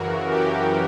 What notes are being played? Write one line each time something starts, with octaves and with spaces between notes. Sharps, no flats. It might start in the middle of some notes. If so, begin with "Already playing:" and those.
Already playing: F#2 C#3 E3 F#4 A#4
G4